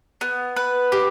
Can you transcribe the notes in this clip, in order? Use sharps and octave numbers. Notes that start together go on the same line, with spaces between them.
B3
B4
G4